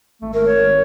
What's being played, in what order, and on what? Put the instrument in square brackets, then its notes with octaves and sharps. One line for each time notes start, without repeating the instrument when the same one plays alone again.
[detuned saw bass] G#1 [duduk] A3
[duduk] A3 [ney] A#4
[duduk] C#5